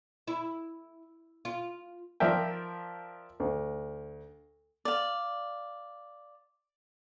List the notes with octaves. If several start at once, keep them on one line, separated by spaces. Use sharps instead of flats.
E4
F4
F3 A#4 D5 E5 G5
D2
D5 F5